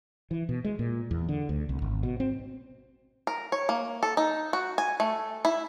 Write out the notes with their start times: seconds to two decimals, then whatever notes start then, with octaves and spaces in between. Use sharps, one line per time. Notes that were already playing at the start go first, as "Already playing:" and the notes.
0.31 E3
0.49 B2
0.64 G#3
0.79 A#2
1.11 E2
1.29 D3
1.49 D2
1.69 C2
1.82 G#1
2.03 B2
2.20 C4
3.27 A#4
3.52 C#5
3.69 A#3
4.03 A4
4.17 D#4
4.53 F#4
4.78 G#5
5.00 A3
5.45 E4